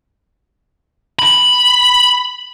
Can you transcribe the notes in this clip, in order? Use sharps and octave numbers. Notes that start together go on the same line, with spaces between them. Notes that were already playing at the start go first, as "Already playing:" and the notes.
B5